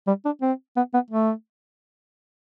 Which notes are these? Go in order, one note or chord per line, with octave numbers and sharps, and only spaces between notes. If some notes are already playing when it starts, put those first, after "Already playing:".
G3
D4
C4
B3
B3
A3